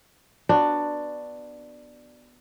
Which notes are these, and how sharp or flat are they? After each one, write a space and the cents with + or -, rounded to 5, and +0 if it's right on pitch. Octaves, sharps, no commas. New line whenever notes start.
B3 +0 D4 +10 F#4 +0